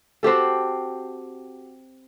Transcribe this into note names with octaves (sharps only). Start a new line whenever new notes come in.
C4 F#4 G4 A4